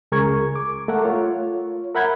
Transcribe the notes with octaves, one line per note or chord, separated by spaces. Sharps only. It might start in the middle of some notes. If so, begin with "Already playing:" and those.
C#2 G#4 A#4 C#6 G#6
D6
A3 A#4 E5 F#5
F4 C#5
A#4 E5 F#5 B5 G6 G#6